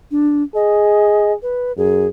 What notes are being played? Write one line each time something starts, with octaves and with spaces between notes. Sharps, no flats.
D4
G#4 D#5
B4
F#2 G#4